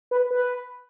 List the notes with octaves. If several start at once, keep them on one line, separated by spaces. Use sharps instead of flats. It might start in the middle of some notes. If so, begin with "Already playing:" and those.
B4
B4